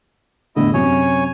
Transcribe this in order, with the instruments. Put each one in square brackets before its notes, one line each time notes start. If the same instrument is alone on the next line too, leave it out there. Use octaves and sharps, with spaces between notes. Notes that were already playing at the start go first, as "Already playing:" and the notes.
[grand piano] E2 A2 D3 [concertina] E4 D#5
[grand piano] F#2 C3 [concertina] C#5 G#5